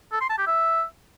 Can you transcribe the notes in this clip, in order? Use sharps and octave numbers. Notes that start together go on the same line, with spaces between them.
A4
C6
A5
G4
E5